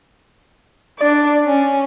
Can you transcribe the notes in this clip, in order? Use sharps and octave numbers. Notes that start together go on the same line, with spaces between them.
D4 D5
C#4